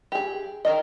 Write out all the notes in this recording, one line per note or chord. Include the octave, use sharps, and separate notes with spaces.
G4 G#4
D#3 A#4 D#5